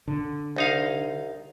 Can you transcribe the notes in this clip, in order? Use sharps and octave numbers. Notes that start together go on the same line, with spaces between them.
D3
C2 D#4 F5